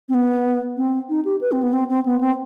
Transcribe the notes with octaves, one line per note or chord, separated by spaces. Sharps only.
C4
B3
C4
D#4
G4
B4
C4
B3
C4
C4
B3
C4